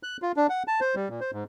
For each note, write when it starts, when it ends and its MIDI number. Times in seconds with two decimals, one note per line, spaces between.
0.03 0.17 90
0.22 0.32 65
0.36 0.47 62
0.50 0.63 78
0.68 0.80 81
0.81 0.95 72
0.95 1.08 55
1.09 1.20 46
1.21 1.31 72
1.32 1.44 44